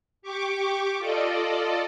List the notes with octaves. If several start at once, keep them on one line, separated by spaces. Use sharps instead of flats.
G4 C#6 D6
F4 A4 D5 D#5